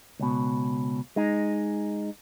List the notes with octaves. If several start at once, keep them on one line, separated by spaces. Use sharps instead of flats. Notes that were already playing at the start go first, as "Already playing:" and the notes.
C#2 B2
G#3 D#4